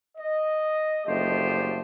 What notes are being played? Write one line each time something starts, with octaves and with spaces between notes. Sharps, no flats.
D#5
F#1 D2 F3 A3 G4 C5